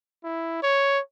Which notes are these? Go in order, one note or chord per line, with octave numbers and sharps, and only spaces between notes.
E4
C#5